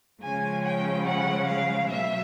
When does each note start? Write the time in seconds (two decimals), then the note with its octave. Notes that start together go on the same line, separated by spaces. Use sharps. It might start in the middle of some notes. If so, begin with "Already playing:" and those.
0.22 C#3 F3 G#3 C#4 G#5
0.64 G5
1.06 F#5
1.48 F5
1.89 B2 F#3 A3 E5